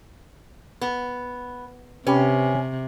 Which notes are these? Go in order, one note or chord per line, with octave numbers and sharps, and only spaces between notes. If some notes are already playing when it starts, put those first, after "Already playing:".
B3
C3 C#4 G4 B4